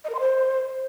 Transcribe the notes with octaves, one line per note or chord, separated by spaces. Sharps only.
D#5
A#4
C6
C5